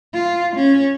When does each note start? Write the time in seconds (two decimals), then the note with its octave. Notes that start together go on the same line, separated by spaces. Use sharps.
0.14 F4
0.56 C#4